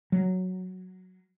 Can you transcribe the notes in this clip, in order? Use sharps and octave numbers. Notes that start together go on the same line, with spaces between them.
F#3